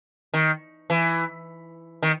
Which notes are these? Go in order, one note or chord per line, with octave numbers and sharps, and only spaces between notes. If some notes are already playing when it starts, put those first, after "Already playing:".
D#3
E3
D#3